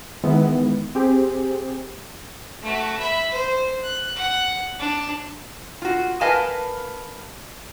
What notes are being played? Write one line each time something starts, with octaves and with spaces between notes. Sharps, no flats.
D#3 E3 G#3 B3 E4
C4 G4 G#4
A3 F#4
E5 B5
C5
F#6
F#5
D4
F4 F#4
A#4 B4 D#5 F5 G#5 A5